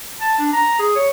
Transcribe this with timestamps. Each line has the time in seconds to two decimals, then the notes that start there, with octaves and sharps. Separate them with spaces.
0.21 A5
0.39 D4
0.53 A#5
0.79 G#4
0.96 C#5